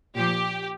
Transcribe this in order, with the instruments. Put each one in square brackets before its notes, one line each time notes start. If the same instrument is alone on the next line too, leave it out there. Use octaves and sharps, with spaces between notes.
[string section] A#2 F3 G4